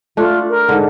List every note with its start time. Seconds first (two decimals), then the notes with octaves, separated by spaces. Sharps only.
0.17 A3 D4 F4
0.49 A#4
0.69 G#2 D3